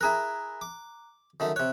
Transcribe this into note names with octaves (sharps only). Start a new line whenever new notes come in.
E4 G#4 A#4 A#5 F#6
D6
F#2 D#3 A3
C3 C#5 F#6